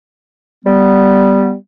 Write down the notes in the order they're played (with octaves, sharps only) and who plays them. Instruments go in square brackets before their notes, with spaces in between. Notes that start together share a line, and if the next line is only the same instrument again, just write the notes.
[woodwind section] G3 B3